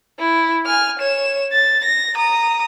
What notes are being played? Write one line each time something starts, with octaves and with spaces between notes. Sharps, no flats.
E4
G#5 F6
C#5 E7
A6
A#6
A#5 D#6